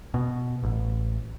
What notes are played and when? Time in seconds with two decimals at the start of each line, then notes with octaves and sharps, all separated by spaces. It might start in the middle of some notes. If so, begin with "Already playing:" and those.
0.14 B2
0.63 A1